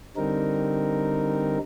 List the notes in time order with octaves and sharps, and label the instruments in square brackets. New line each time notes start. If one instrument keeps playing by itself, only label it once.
[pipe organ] D3 G3 C4 D#4 A#4